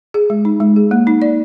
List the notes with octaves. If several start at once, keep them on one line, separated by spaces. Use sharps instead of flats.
G#4
G#3
D#4
G#3
G#4
A#3
D#4
D5